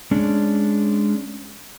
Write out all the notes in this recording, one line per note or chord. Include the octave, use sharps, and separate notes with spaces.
G#3 C#4 D4